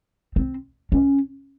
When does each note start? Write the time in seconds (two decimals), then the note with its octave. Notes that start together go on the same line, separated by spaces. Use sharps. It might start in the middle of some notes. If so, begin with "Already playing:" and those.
0.36 C4
0.92 C#4